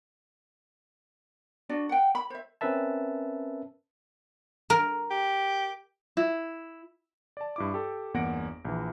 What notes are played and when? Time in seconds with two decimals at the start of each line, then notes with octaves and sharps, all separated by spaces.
1.69 D4 F#4 D5
1.89 F#5 G5
2.15 B5
2.30 C5 E5
2.61 C4 C#4 A#4 B4 E5 A5
4.70 A#4
5.11 G4
6.17 E4
7.37 D5 A5
7.56 G2 E4 D6
7.74 G4 A4
8.14 G1 E2 A#3 F#5 A#6 D7
8.65 A#1 E3